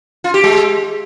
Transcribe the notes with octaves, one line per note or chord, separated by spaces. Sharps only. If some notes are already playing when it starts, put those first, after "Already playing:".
F4
G4
G#3